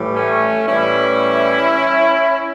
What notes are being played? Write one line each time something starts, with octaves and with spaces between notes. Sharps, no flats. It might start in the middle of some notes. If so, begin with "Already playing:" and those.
Already playing: A2 E3 G3
A3 C#4
A2 E3 G3 C#4 E4